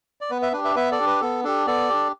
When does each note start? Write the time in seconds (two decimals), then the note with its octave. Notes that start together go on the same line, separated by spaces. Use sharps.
0.21 D5
0.30 B3 B4
0.42 B4 E5
0.53 D4 G4 B4
0.64 B4 E5
0.75 B3 B4 E5
0.92 A4 D5
0.99 D4 G4
1.06 B4
1.21 B3 A4
1.44 D4 G4 A4
1.67 B3 A4 D5
1.90 D4 G4